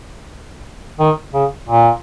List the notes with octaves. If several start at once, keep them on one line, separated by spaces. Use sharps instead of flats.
D#3
C#3
A#2